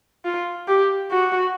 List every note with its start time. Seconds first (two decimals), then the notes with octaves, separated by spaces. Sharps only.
0.25 F4
0.68 G4
1.11 F#4